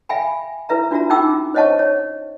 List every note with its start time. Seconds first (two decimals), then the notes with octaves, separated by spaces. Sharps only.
0.09 E5 F5 G5 G#5 B5
0.69 E4 B4 E5 A#5
0.91 D4 F4 F#4 E5 A#5
1.10 C#4 D#4 F4 G5 D6 E6
1.54 C5 C#5 D#5 F#5 A5 C#6
1.79 C#5